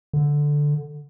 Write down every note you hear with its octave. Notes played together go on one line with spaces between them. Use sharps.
D3